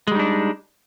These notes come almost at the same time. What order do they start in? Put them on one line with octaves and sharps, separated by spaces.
G#3 G3 D#4 D4